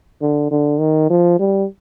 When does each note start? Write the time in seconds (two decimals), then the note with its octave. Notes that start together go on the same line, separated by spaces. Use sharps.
0.21 D3
0.51 D3
0.80 D#3
1.10 F3
1.39 G3